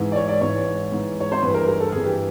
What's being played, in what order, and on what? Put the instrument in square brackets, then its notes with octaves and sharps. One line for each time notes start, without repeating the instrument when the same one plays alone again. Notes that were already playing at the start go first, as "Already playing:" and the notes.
Already playing: [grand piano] G#2 E3
D5
C#5
D5
G#2 E3 C#5
G#2 E3
C#5
C5
G2 E3 B4
A#4
A#4
A4
G2 E3 G#4
G4